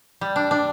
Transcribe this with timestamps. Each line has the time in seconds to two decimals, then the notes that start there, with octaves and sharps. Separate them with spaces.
0.21 G3
0.36 D4
0.51 D4